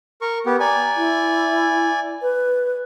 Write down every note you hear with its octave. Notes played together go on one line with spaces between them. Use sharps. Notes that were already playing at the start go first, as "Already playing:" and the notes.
A#4 C#6
B3 G4
D5 G#5 A#5
E4
B4